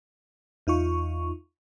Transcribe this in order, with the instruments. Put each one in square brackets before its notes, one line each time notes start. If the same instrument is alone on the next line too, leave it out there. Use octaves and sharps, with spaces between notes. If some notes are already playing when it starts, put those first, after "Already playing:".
[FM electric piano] E2 D#4 F4 C#6